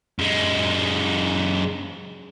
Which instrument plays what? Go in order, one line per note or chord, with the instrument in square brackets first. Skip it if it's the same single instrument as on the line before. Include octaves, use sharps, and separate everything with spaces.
[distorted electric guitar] F#2 G#3